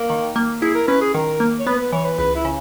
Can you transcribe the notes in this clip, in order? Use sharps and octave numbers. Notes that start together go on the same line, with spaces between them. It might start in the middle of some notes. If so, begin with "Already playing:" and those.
Already playing: A#3
D#3
A#3
E4 G#4
A#4
C#4 B4
G#4
D#3 A#4
A#3
C#5
B3 B4
B4
E3 C#5
B4
C#2 B4
E4
C#3